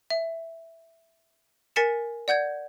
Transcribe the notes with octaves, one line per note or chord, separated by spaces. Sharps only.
E5
A#4 G#5 A6 B6 C#7 E7
D5 F#5 G6 G#6